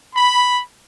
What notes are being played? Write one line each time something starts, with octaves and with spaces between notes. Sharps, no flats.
B5